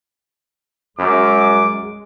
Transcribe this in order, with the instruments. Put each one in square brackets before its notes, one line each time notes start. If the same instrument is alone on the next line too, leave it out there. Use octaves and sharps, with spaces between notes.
[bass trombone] F#2 [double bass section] G#3 [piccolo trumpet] D6